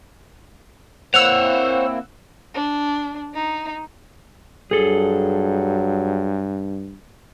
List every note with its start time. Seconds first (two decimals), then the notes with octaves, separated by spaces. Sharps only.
1.14 A#3 C4 E4 C5 C#5 F#5 E6 F7
2.54 D4
3.34 D#4
4.71 G2 F#3 G#4 A4